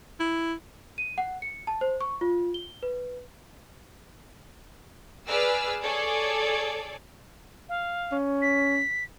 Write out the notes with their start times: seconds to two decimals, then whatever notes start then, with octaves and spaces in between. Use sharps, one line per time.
0.20 E4
0.98 D#7
1.18 F#5
1.42 C#7
1.67 A5
1.81 C5
2.01 C#6
2.21 F4
2.54 G7
2.83 B4
5.27 G#4 B4 D5 E6 F6
5.81 G#4 A4 C#5 D5
7.69 F5
8.12 C#4
8.42 B6